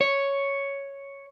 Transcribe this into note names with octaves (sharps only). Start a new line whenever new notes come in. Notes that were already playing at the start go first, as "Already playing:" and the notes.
C#5